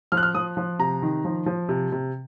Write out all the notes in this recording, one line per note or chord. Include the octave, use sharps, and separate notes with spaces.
F3 F6
F#6
F6
F3 D#6
F3
C3 A#5
D#3
F3
F3
C3
C3